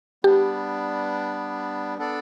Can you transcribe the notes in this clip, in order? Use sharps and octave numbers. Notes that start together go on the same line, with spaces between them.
G3 B3 D4 G4
B3 D4 A4 D5